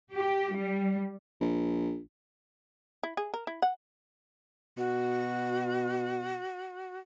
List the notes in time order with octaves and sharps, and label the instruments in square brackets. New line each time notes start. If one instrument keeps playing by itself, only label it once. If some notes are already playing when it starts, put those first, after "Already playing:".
[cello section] G4
G3
[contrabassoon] A#1
[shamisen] E4
G#4
A#4
E4
F#5
[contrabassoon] B2 [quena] F#4